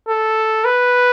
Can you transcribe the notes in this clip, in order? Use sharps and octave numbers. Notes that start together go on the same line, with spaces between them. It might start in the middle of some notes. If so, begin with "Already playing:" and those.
A4
B4